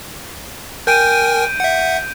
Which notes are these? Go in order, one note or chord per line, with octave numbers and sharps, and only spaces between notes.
A#4 G5 G#5 G6 D7 D#7
E5 F#5